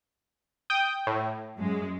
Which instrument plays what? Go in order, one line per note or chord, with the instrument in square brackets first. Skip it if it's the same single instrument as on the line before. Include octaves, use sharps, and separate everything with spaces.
[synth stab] G5 D#6
A2
[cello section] F#2 G#3